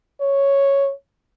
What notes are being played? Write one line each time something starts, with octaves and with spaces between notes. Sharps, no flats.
C#5